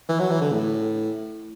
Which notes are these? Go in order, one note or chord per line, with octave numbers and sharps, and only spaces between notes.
E3
F#3
E3
D3
A2